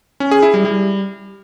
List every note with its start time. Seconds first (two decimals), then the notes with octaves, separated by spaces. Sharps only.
0.20 C#4
0.31 G#4
0.43 E4
0.54 G3
0.65 G3